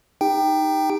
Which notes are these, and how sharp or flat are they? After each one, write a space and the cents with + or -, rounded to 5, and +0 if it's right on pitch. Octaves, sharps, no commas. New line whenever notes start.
D#4 +0 G4 +35 G5 +0